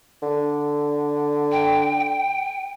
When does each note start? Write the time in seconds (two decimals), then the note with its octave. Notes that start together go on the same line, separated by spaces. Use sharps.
0.23 D3
1.52 G5